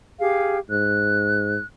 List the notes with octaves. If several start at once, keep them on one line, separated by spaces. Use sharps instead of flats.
G4 G#4 F5
G#2 F#6